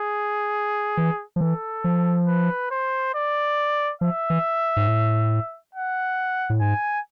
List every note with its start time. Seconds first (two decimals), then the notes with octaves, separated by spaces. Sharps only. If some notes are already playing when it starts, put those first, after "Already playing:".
Already playing: G#4
0.97 E3
1.36 F3
1.41 E3 A4
1.84 F3
2.28 B4
2.71 C5
3.15 D5
4.01 F3 E5
4.30 E3
4.76 G#2
4.88 A2
5.75 F#5
6.50 A2
6.61 G#2 G#5